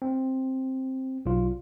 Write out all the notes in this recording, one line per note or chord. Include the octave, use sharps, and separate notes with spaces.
C4
B1 F4